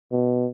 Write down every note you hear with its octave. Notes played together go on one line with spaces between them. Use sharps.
B2